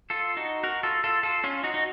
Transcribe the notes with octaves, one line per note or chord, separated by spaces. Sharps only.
F4 A4
D#4 F#4
F#4 A#4
F4 A4
F4 A4
F4 A4
C#4 F4
D#4 F#4
D#4